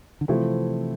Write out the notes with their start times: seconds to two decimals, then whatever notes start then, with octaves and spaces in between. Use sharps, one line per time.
0.21 D3
0.28 C3 E3 F3 A3 C4 E4